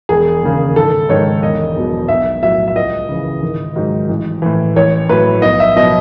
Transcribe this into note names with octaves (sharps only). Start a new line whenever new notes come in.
E1 G#4
D#2 C#3
G#1 A4
G#2 D#3 C#5
E1 D#5
E2 B2 F#3
B1 E5
A2 F#3 E5
E5
C#2 D#5
C#3 E3
G#1
G#2 D#3 F#3
A1
A2 E3
A1 C#5
A2 F#3 B4
B1 D#5
E5
B2 F#3 D#5